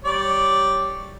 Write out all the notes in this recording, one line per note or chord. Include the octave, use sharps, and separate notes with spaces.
G3 C#5 D5